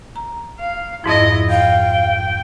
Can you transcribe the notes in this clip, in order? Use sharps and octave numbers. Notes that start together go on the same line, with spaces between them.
A#5
F5
F2 G#2 F3 E4 D#5
F5 G5